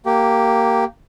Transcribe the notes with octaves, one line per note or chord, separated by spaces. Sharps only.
A#3 G4